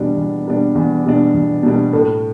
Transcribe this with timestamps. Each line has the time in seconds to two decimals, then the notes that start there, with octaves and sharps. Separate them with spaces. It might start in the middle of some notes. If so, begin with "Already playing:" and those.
Already playing: E2 B2 G3 D4
0.17 E2
0.47 B2 G3 D4
0.75 E2
1.05 B2 G3 D4
1.34 E2
1.63 B2 G3 D4
1.93 A2